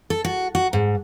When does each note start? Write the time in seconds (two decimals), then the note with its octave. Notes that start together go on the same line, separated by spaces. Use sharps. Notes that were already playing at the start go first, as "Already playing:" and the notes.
0.10 A4
0.25 F#4
0.55 F#4
0.73 G#2